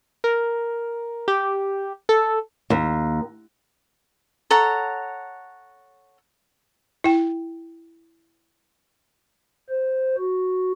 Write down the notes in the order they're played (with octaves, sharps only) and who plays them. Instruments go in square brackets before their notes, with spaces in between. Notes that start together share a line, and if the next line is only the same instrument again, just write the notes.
[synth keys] A#4
G4
A4
[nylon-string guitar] D#2
[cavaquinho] A4 C#5 F#5 A#5
[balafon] E4 G5
[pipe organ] C5
F#4